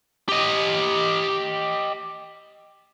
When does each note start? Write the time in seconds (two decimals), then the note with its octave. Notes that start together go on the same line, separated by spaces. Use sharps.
0.29 G4 D#5